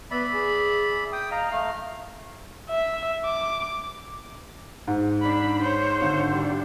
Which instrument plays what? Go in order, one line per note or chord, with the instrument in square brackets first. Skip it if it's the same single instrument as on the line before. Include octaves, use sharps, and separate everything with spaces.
[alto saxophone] B3 [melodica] D5 E5 B5
[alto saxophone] G#4
[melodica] G5 D#6
[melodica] D#5 A#5 [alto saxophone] F5
[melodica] A3 [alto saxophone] F5
[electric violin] E5
D6
[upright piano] G#2
[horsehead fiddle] D4 B5
C5 C#5
[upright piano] G#1 D3
[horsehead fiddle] G3 D4